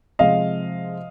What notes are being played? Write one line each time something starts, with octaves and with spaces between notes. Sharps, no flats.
C3 F3 G#3 D#5 F5